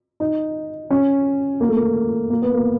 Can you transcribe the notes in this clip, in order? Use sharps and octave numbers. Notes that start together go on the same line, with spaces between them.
D#4
C#4
A#3
A3
A#3
A#3
B3
A#3